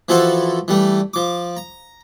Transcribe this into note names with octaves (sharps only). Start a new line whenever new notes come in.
E3 F3 E4 F#4 A4 C5
E3 G3 A3
F3 D6
A#5